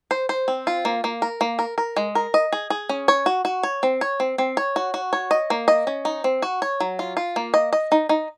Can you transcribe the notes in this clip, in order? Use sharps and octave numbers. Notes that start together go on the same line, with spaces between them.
C5
C5
C4
F4
A#3
A#3
A#4
A#3
A#4
A#4
G#3
A#4
D#5
G#4
G#4
C#4
C#5
F#4
F#4
C#5
C4
C#5
C4
C4
C#5
F#4
F#4
C#5
D#5
A#3
D#5
C#4
D#4
C4
F#4
C#5
F#3
F4
F4
A#3
D#5
D#5
D#4
D#4